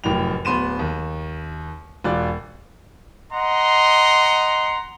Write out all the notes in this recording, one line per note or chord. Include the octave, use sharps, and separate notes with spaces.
F1 F#2 A2 G5 F7
D1 B3 C6 D#7 E7
D#2
E1 F4 D5 F#6
D#5 F#5 A#5 C6